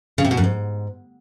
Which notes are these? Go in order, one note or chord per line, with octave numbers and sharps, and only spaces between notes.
C#3
C3
B2
F#2
G#2